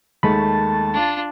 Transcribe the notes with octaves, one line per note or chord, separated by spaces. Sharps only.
D#2 D#3 G#3 A3 A5 B5
D4 F4